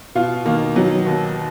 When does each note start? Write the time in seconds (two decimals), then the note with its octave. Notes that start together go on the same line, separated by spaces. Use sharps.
0.15 B2 F4
0.46 D#3 A#3
0.76 F#3 B3
1.06 D#2